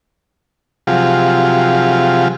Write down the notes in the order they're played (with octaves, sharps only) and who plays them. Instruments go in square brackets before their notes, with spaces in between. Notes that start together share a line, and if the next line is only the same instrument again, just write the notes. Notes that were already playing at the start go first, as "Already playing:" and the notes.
[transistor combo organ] C3 F3 F#3 F4 G4 G#4